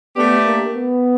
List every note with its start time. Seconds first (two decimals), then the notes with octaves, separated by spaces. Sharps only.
0.16 A3 B3 D4 G4
0.45 A#3
0.75 B3